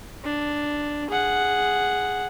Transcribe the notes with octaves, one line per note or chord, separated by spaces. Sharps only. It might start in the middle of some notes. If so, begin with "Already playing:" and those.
D4
G#4 F#5